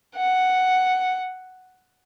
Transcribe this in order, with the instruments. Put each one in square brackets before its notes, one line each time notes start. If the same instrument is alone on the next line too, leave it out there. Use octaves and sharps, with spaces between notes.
[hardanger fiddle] F#5